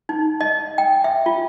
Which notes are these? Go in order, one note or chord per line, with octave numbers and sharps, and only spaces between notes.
D#4
D#5
G5
E5
F4